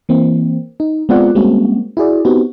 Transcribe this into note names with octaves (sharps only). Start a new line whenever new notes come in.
E3 A#3 C4
D#4
G#3 B3 C4 F4 D5 F#5
G3 G#3 A#3 C4 C#4 F#4
E4 F#4 G#4 D5
B3 C4 D#4 F#4 G4